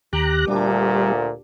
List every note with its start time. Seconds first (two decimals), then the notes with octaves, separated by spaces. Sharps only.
0.13 D#2 G4 A#5 F#6
0.48 D2 A#2 G3 D4